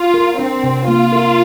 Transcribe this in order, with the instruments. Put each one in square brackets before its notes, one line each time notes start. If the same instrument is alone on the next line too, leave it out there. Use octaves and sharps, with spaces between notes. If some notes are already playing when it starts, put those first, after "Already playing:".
Already playing: [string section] F4
[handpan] A#4
[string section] C4 [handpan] D4
[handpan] C3
[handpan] A#3 [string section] F4
[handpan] A#4